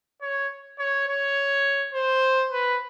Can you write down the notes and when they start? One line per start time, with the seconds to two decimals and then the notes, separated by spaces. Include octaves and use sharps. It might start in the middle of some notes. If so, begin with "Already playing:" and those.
0.22 C#5
0.79 C#5
1.08 C#5
1.94 C5
2.51 B4